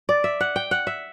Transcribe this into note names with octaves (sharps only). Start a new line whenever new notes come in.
D5
E5
F#5
G5
F#5
E5